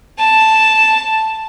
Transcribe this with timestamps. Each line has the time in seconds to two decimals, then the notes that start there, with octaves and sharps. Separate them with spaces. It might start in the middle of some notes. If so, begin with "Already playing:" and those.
0.19 A5